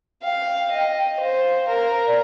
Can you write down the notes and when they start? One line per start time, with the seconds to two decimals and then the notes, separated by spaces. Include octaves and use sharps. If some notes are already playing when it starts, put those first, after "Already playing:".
0.23 F5 G5
0.72 D#5
1.20 C5 F5
1.68 A#4
1.96 C5
2.06 D5